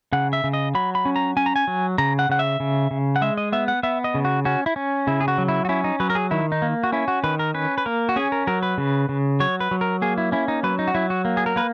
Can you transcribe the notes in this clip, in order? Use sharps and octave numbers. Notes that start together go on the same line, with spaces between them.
C#3 F#5
E5
C#3
D#5
F#3 B5
B5
C#4
A#5
C#4 G#5
A#5
G#5
F#3
C#3 A#5
F#5
C#3 F#5
E5
C#3
C#3
F#5
G#3 E5
D#5
B3 E5
F#5
B3 E5
D#5
C#3
F#4
C#4 F#4
E4
C#4
C#3 E4
G#4
F#4
F#3
E4
F#4
C#4 E4
D#4
F#3 B4
A#4
G#4
D#3 E4
D#4
A#3
F#4
C#4 E4
F#4
D#3 B4
A#4
C#4 B4
B4
A#3 A#4
F#4
C#4 G#4
A#4
F#3 A#4
B4
C#3
C#3
F#3 C#5
B4
F#3
A#4
A#3 G#4
E4
C#4 E4
D#4
F#3 B4
D#4
F#4
F#3 E4
F#4
A#3
G#4
A#4
A#3 B4